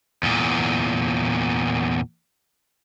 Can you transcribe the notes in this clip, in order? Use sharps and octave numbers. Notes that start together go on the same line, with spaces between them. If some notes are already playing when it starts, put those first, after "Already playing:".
E2 A#2